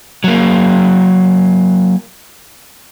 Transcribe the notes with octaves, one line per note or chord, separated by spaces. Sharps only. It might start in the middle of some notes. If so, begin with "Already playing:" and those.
F#3 A#3